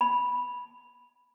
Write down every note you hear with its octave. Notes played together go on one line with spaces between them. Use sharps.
B5